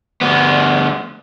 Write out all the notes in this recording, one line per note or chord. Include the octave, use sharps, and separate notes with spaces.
D2 B3